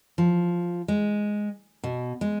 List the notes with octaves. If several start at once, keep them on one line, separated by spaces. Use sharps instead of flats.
F3
G#3
B2
G#3